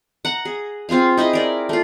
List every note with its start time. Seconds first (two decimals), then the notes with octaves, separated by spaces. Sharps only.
0.25 F#5 A#5
0.45 G#4
0.89 C4 F4 G#4 F5
1.17 D#4 E4 G#4 D#5
1.33 A#4 D5
1.69 A3 F4